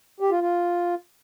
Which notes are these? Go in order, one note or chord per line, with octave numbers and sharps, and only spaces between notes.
G4
F4
F4